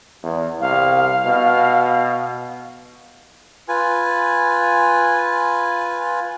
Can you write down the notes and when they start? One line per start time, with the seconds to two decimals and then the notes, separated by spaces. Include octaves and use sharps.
0.23 E2
0.61 C2 F5
1.25 B2
3.68 F4 B4 G#5